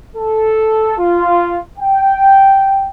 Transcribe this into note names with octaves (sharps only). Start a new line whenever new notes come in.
A4
F4
G5